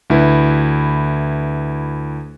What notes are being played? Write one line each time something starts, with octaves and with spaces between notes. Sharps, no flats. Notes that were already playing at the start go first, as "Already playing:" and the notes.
D2 E4 B4